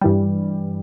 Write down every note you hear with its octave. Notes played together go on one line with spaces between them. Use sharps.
G2 E3 G3